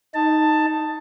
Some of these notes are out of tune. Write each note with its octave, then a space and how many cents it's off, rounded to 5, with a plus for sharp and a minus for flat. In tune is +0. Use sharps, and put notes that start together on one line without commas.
D#4 +0 A5 +10